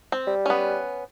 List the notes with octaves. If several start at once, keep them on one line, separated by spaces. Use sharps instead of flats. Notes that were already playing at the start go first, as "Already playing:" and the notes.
C4
G3
B3 C#4